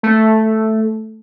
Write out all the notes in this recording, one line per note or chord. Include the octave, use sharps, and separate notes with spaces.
A3